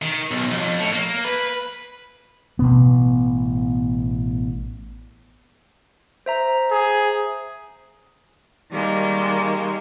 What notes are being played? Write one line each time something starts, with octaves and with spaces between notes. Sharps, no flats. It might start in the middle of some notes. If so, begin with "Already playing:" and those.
D#3
B1
F2
A2
A#3
B4
A1 B2 B3
C5 E5 A#5
G#4
D#3 G3 G#3 A#3